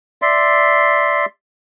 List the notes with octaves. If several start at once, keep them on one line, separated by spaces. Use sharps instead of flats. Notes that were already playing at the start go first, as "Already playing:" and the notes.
D5 E5 C6